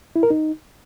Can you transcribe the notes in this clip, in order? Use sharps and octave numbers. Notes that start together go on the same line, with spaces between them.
E4
A#4
D#4